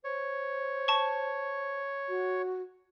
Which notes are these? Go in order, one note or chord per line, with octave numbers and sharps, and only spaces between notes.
C5 C#5
A5 C#6
F#4